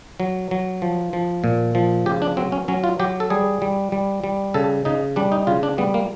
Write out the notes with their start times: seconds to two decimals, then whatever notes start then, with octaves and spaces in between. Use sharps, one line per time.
0.20 F#3
0.51 F#3
0.82 F3
1.13 F3
1.44 A#2
1.75 F3
2.06 C#3 G4
2.22 D4
2.37 F#3 C4
2.52 C#4
2.68 F#3 C#4
2.84 F4
2.99 F#3 G4
3.20 A4
3.30 G3 G#4
3.62 G3
3.92 G3
4.24 G3
4.54 C#3 A4
4.85 C#3 D#4
5.16 G3 D4
5.32 D#4
5.47 C#3 F4
5.63 D4
5.78 G3 B3
5.94 A#3